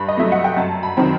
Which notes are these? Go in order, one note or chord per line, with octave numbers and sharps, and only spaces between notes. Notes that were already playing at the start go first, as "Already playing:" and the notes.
Already playing: G2 B5
D#5
F#3 A3 E5
F#5
G5
F#2 A5
B5
D#3 F#3 C4